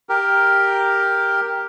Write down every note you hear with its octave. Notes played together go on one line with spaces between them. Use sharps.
G4 A#4